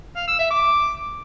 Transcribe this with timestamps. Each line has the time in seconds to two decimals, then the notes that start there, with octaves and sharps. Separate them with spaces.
0.16 F5
0.27 E6
0.39 E5
0.50 D6